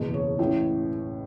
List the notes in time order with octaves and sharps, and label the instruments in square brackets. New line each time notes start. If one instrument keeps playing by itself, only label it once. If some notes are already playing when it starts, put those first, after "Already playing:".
Already playing: [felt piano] F#1 E2 B2
C#5
A1 A2 E3